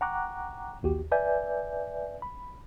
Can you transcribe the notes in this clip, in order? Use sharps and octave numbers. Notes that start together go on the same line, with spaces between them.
F#5 G5 A#5 C#6 D6 F#6
A#1 D#2 F#4 G4
B4 D5 E5 G#5 G6
B5